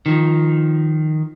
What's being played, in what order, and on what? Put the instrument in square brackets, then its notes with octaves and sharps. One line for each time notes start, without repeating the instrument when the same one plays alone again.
[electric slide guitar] D#3 F3